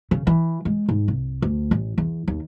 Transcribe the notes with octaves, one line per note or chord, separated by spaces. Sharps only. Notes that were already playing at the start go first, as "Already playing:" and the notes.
C#3
E3
G#3
G#2
C2
D2
A1
E2
D#2